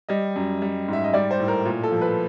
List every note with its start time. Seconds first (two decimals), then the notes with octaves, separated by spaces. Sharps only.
0.09 G3 D#5
0.36 F#2
0.62 G3
0.88 G#2 E5
1.04 D#5
1.14 G3 D5
1.31 C5
1.40 A2
1.48 A#4
1.65 A#2
1.83 A4
1.92 F3
2.02 B4